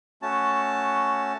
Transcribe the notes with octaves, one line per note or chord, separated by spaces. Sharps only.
A3 C#4 F#4 A5